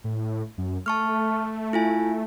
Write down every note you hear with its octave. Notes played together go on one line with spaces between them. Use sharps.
A2
F#2
A3 A5 C#6 F6
E4 F4 G#5